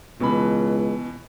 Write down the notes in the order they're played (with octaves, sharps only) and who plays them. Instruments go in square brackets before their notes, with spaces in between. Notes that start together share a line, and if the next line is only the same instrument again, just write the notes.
[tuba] C#2 [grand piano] B2 E3 B5